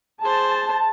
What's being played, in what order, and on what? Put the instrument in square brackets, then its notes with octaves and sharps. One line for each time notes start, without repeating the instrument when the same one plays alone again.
[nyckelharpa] G#4 C5 [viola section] A5